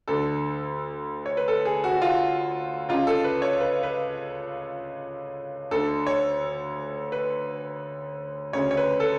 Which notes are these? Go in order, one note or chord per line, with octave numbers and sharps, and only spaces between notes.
D2 D3 A4
C#5
B4
A4
G#4
F#4
F#4
F4
C#2 C#3 F4
A4
B4
C#5
B4
B4
D2 D3 A4
C#5
B4
D2 C#3 C#5
C#5
B4
A4